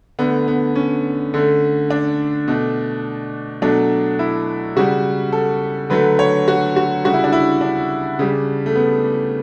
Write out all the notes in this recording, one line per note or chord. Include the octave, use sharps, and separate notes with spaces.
D3 A3 B3
B3
C#4
D3 A3
D4
B2 A3
B2 F#3 A3 D4
E4
C#3 G3 F#4
A4
D3 F#3 A3 B4
C#5
F#4
F#4
C#3 G3 F#4
E4
D4
E4
D4
C#3 G3
A3
B3